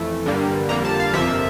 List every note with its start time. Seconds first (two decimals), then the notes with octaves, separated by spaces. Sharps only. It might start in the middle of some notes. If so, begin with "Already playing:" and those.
Already playing: F2 E3 A3
0.26 G2 D3 G3 A#3
0.69 F2 D3 G3 A#3 A#5
0.85 A5
1.00 F5
1.13 G1 F2 C3 F3 A#3 E5